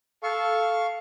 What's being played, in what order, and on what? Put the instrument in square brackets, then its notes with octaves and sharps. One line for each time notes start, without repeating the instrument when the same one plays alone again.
[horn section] A4 [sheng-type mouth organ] F5 C#6